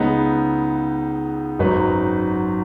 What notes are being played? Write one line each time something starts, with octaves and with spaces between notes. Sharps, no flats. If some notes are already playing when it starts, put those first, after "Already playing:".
Already playing: C#2 C#3 B3 D#4
G#1 F#2 F#3 D#4 B4